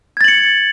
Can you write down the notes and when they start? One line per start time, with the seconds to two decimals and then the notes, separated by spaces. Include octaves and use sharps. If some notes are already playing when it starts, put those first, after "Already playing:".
0.17 G#6
0.21 A6
0.24 F#7
0.28 C#7